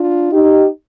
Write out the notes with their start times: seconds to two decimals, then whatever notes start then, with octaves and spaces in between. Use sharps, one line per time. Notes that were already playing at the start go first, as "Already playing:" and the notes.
Already playing: D4 F4
0.32 D#4 G4